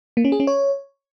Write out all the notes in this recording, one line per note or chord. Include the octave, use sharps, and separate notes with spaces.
A#3
C#4
G#4
C#4
C#5